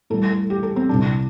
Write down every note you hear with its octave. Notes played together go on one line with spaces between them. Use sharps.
A2 G3 A4
A4
G4
A4
C4
C2 C3 G3 D4